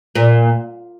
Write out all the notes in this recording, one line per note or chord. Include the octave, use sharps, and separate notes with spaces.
A#2